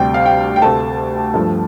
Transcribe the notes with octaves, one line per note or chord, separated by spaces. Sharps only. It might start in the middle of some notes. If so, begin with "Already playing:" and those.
Already playing: D2 C3 G3 G5
F5
G5
G5
D2 C3 A3 A5
G2 F3 A3